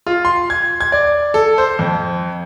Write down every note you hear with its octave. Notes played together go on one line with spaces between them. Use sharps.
F4
C6
G#6
G#6
D5
A4
C5
F2